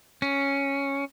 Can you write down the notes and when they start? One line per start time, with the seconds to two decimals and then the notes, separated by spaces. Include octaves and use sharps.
0.22 C#4